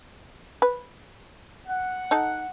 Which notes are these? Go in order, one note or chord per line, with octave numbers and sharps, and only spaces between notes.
B4
F#5
D#4 A4